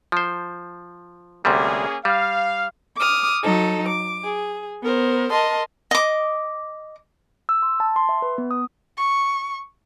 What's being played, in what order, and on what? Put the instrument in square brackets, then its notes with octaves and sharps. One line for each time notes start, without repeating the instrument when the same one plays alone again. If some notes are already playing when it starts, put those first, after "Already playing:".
[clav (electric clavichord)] F3 C5
[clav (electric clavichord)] D2 C3 G3 [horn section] A#3 C#4 G#4
[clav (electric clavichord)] G3 [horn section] F5
[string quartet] D6 D#6 F6
F#3 D#4 A4
D6
G#4
B3 A#4 C5
A#4 D#5 A5 C6
[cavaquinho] D#5 D6
[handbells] E6
C6
A5
C6
E5
B4
B3
D#6
[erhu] C#6